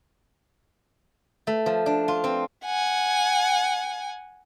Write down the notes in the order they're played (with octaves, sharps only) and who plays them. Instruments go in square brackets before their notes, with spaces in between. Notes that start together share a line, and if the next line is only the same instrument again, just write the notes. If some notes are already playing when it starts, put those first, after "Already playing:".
[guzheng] A3
F3
D4
F4
C4
[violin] F#5 G#5